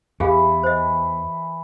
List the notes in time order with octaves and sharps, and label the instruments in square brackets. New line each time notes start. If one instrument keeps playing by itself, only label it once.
[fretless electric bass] E2 [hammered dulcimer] E3 [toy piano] G4 G#4 F5
[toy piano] C5 D#5